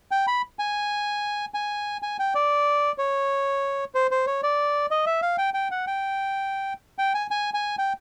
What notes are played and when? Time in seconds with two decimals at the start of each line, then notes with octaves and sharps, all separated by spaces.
0.11 G5
0.27 B5
0.59 G#5
1.54 G#5
2.03 G#5
2.19 G5
2.35 D5
2.98 C#5
3.95 C5
4.11 C5
4.27 C#5
4.43 D5
4.91 D#5
5.06 E5
5.22 F5
5.38 G5
5.54 G5
5.71 F#5
5.87 G5
6.99 G5
7.14 G#5
7.31 G#5
7.54 G#5
7.79 G5